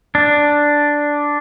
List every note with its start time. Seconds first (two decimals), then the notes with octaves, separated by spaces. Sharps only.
0.15 D4